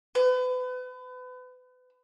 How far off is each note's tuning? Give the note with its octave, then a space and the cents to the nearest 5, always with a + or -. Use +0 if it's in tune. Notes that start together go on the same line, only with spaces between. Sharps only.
B4 +35